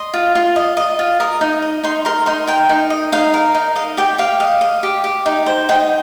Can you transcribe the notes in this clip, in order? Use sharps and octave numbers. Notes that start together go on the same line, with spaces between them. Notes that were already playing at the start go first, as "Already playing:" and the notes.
Already playing: D#5 C6
F4
F4
D#5
D#5
F4
A#4 D#6
D#4
D#5
D#4 C6
A#4 C6
D#4 C6
A#4 G5
D#4
D#5
D#4 F5
A#4
D#4
D#5 F5
G4 G5
G4 F5
D#5 F5
D#5
G4
G4
D#4
C5
D#4 G5